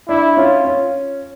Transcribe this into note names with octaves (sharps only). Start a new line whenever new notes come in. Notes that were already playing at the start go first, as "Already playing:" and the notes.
D4 E4
C#4 F4
C#4